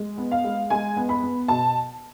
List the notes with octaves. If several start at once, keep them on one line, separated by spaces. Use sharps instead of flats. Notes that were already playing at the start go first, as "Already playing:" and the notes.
Already playing: G#3
B3
F5
G#3
G#3 G#5
B3
B5
B3
B2 A5